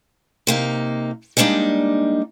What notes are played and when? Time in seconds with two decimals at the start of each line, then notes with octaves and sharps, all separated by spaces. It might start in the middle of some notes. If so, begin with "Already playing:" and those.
0.47 C3 A#3 D#4
1.37 G3 G#3 A#3 D4 D#4